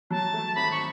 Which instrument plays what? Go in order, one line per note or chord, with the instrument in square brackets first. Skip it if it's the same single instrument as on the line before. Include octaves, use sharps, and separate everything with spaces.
[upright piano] F#3 [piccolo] A5
[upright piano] A3
[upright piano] G#1 [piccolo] B5
[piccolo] C#6